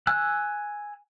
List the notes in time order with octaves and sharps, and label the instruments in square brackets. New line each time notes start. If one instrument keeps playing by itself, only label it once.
[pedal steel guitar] G#5 E6 F#6